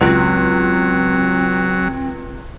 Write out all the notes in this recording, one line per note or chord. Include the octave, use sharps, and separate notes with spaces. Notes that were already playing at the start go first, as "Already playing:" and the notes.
C#2 F#3 C4